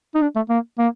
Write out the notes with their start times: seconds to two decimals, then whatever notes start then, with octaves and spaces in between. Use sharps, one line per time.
0.15 D#4
0.22 D4
0.35 A3
0.50 A#3
0.79 A#3